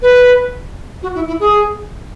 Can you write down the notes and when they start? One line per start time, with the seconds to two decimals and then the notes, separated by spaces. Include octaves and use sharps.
0.02 B4
1.02 F#4
1.15 E4
1.28 E4
1.40 G#4